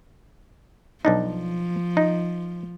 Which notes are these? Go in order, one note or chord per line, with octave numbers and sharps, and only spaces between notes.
B1 F3 D4 D#4
D#4